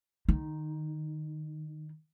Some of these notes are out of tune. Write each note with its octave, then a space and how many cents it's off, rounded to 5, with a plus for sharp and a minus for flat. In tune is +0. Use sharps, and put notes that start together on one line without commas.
D#3 -25 D#4 +0